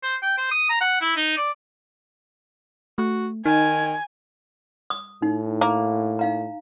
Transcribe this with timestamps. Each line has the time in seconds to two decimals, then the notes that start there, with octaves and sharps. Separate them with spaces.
0.03 C5
0.22 G5
0.38 C5
0.51 D#6
0.69 A#5
0.81 F#5
1.01 E4
1.16 D#4
1.37 D5
2.98 A3 F#4
3.46 D#3 D#4 G#5
4.90 D#6
5.22 A2 D#4
5.61 A#3
6.19 D#4 F5 A#5